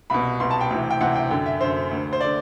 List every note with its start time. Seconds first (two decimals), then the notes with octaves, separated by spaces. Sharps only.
0.10 C2 B2 B5
0.40 C2 B2 C6
0.51 A5
0.61 G5
0.70 D2 C3 E3
0.91 G5
1.01 D2 C3 E3 F#5
1.16 G5
1.31 F#2 D3 G5
1.46 E5
1.61 F#2 D3 C5
1.91 D2 D3
2.13 C5
2.21 D3 D5